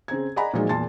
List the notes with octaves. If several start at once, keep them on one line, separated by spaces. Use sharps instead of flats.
C#3 C4 A#5 G#6
D5 D#5 F#5 G#5 A#5 B5
A#2 F3 F#3 G#3 D#4
E2 A#2 A5 C6 A6